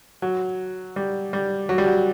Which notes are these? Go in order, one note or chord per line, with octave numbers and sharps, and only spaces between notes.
F#3
G3
G3
F#3
G3
F#3